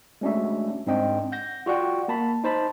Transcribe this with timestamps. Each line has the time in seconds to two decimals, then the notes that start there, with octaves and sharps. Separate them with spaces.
0.21 G#3 A3 C#4 D4 F#4 E5
0.87 G#2 C4 D4 D#5 G5
1.32 F#5 G6 A#6
1.66 F4 F#4 D5 F#5 G5
2.08 A#3 A5 B5
2.44 D#4 C5 A5 B5